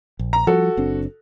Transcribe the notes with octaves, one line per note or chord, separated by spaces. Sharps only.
A#1
A#5
F3 G3 F#4 A4
F#1 C4 D4